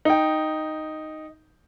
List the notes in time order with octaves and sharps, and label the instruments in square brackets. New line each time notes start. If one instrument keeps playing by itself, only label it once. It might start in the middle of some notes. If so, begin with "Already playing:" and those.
[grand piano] D#4 G5